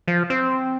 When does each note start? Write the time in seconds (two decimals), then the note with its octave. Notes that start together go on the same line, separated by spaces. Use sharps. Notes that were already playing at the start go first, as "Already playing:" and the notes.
0.08 F3
0.30 C4